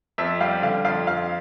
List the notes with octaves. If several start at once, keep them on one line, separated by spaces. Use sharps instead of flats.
F2 E5
G3 F5
D3 F5
F2 F5
F2 F5